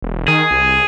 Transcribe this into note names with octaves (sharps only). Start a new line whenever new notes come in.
E1
D#3 G#4
C2